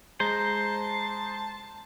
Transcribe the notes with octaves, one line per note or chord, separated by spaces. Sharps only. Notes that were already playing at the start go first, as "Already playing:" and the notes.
G#3 C5 A5 A#5